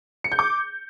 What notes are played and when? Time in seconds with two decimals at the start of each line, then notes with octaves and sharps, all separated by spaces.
0.24 C#7
0.32 G6
0.39 D6